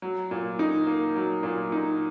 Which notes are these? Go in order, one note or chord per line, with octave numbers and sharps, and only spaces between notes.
F#3
A#2
D#4
A#3
F#3
A#2
D#4